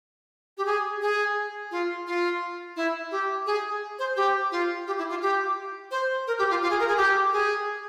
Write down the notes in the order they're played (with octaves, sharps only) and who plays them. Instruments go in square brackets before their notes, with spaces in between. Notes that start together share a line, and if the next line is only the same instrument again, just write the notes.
[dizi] G4
G#4
G#4
F4
F4
E4
G4
G#4
C5
G4
F4
G4
E4
F4
G4
C5
A#4
G4
F4
F4
G#4
A#4
G#4
G4
G#4